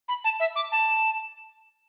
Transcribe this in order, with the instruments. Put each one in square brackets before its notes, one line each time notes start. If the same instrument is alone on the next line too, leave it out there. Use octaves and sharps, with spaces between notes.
[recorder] B5
A5
E5
D6
A5